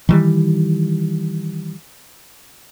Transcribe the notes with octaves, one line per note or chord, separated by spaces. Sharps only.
D#3 E3 G3